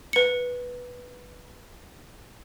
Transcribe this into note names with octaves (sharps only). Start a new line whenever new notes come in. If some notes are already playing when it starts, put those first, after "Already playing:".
B4 C#7